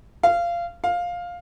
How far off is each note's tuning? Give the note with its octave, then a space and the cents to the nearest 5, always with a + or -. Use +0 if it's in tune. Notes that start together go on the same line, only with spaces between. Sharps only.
F5 -20
F5 +10